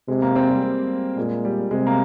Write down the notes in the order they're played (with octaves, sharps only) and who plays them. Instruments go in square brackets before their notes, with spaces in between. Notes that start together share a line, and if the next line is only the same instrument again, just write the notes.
[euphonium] C3 [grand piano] G#3
[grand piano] A#3
C4
G3
G3
[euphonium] A#2 [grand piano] G#3
[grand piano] G3
[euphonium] C3 [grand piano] G#3
[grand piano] A#3